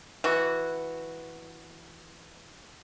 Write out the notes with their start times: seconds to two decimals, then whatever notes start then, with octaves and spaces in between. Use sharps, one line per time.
0.24 E3 F#4